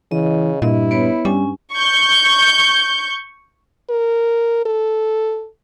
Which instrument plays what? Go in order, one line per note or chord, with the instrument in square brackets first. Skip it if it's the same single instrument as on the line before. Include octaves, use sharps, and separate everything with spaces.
[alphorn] C#3 [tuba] E3 [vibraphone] D#5
[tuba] G2 [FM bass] A#2 [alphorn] E4 [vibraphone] D#5
[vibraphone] B3 B4 C#5
[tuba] G2 [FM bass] G3 [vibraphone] C#4 G#5
[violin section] C#6 G6
[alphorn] A#4
A4